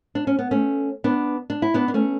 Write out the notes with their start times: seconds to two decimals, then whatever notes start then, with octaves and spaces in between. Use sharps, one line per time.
0.15 D4
0.27 C#4
0.39 B3
0.51 A3 C#4
1.04 B3 D4
1.50 D4
1.62 E4
1.74 B3 D4
1.88 D4
1.94 A3 C#4